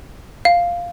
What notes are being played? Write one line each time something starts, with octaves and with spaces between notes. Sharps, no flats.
F5